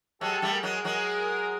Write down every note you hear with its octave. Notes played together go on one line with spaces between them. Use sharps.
F#3 G#3 G4 A4
G3 A3
G#4 A#4
F#3 G#3
F#3 G#3